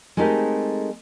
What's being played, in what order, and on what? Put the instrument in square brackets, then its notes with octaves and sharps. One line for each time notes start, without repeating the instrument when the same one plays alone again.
[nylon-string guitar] G#3 A3 C4 D#4 G4 A#4